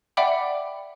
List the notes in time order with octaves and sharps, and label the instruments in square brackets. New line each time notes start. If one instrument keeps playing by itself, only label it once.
[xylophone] D5 E5 F#5 G5 B5 D6